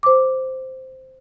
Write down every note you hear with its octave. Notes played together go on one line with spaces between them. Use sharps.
C5 D6